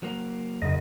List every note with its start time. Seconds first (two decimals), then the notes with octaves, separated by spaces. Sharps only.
0.03 F#3 A#3
0.62 F#1 F2 D#5